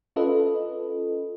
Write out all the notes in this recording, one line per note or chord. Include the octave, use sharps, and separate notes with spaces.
C#4 F4 A4 B4 D#5